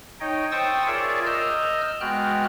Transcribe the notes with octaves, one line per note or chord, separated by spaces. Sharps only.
D#4 C#5 D#5 G5
C5 G5 C#6 D#6 E6 A6
F4 G#4 A#4 C#5 D5 E5
D#5 A#5 E6 F6 G6
G#3 B3 F#4 G5 F6 F#6